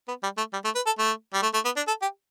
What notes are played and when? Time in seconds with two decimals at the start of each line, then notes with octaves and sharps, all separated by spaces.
0.08 B3
0.23 G3
0.38 A3
0.53 G3
0.65 A3
0.75 B4
0.86 A4
0.98 A3
1.34 G3
1.43 A3
1.54 A3
1.65 B3
1.76 D4
1.88 A4
2.02 G4